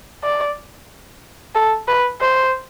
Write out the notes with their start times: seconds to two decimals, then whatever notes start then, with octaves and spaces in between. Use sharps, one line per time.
0.24 D5
1.55 A4
1.88 B4
2.21 C5